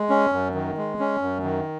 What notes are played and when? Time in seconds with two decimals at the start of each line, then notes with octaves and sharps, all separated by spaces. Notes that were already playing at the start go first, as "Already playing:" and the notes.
Already playing: G#3
0.09 C#4
0.32 F#2
0.55 D#3
0.77 G#3
0.99 C#4
1.22 F#2
1.43 D#3